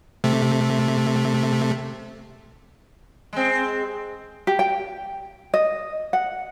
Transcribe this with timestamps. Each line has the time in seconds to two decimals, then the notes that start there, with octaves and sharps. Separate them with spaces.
0.24 C3 A3
3.33 G#3 C4
4.47 G4
4.59 G5
5.54 D#5
6.13 F#5